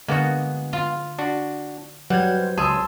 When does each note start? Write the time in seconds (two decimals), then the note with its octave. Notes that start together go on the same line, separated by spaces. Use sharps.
0.08 D3 G#3 A#3 B3 F#4
0.73 F4 F5
1.19 D4 F#4
2.10 F#3 G3 B4 F#5 G6 G#6
2.39 C5
2.58 C#2 G#4 A5 C6 E6